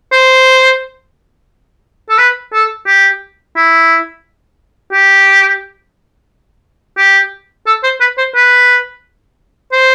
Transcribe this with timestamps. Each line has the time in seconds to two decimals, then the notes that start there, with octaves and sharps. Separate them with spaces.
0.13 C5
2.09 A4
2.18 B4
2.53 A4
2.87 G4
3.56 E4
4.93 G4
6.98 G4
7.66 A4
7.83 C5
8.00 B4
8.18 C5
8.35 B4
9.72 C5